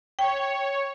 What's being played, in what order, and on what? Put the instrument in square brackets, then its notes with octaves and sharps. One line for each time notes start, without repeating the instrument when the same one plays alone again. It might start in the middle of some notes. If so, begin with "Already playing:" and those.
[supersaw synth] C#5 [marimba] G5